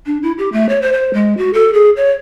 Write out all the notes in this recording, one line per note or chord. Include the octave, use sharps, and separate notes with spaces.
D4
E4
G4
A3
C#5
C5
C5
G#3
F#4
A4
G#4
C#5